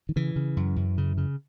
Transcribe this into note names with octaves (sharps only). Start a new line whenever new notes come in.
D#3
C#3 E3
C#3
F#2
F#2
C#3
C#3